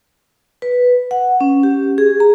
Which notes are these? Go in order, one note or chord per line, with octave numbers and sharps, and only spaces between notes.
B4
F#5
C#4
G4
G#4
A#5